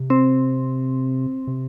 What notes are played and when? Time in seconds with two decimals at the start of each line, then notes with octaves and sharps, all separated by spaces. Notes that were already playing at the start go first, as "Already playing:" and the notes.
Already playing: C3
0.10 C4
1.47 C3